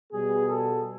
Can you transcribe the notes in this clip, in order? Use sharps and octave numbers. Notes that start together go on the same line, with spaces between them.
B2 G3 B3 G#4
A4